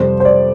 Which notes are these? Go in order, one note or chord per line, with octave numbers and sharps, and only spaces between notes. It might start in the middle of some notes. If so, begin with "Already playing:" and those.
Already playing: F2 C3 G3 C5
C5
D5